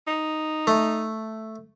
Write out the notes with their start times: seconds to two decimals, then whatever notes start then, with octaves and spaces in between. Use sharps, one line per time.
0.07 D#4
0.67 A3